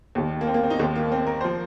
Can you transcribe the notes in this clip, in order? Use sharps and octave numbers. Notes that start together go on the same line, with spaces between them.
D#2 D#3
A#3
C4
A#3
C4
D#4
D#2 D#3 C4
A#3
C4
A#4
F3 C5